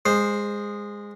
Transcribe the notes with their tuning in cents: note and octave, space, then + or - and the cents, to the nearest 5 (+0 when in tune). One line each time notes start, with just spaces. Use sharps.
G#3 -15 C5 +0